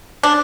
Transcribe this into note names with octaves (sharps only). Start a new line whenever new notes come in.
D4